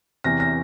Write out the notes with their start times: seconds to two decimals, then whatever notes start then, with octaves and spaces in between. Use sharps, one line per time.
0.24 E2 C3 E3 A#6
0.40 A#6